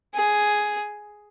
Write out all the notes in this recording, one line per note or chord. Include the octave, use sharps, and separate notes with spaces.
G#4